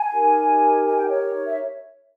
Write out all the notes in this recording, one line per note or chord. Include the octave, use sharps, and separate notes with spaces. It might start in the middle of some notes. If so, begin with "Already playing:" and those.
Already playing: G#5
D#4 G4 A#4
G#5
G5
C#5
E5